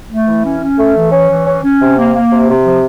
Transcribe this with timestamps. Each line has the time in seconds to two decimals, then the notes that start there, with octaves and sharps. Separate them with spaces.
0.10 A3
0.27 E3
0.44 C#4
0.61 C#4
0.78 A3
0.95 E3
1.12 C#4
1.29 E3
1.46 C#4
1.63 C#4
1.80 C3
1.97 A#3
2.14 A#3
2.31 C3
2.49 C3
2.65 F3